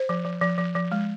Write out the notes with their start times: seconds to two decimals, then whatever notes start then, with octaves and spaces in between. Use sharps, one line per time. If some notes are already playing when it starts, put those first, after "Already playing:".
Already playing: C5
0.09 F3
0.25 F3
0.42 F3
0.58 F3
0.75 F3
0.92 G#3